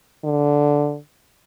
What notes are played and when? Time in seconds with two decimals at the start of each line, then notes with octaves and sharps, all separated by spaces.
0.24 D3